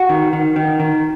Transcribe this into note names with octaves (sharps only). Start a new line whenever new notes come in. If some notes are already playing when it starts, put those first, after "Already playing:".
Already playing: F#4
D#3
D#3
D#3
D#3